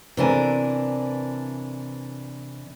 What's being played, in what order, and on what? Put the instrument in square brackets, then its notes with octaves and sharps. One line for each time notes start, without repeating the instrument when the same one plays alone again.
[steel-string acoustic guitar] C3 E3 D4 A#4 F5 G#5